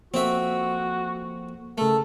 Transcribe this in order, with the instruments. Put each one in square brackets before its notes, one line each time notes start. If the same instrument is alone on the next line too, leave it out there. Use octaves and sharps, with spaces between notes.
[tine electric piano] F3 A#3 A4 [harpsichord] C4 E5 [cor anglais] F#4
[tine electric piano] C#3 A#4 [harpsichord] A3 [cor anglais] A4